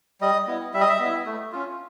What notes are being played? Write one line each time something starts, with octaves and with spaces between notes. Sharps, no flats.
G3 D#5
B3 E4
G3 E5
D#5
E5
B3 E4
A3
C#4 F4